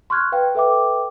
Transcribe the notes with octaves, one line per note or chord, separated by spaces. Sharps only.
C6 C#6 F6 F#6 G#6
B4 F5 G5
A4 B4 E5 G5 D6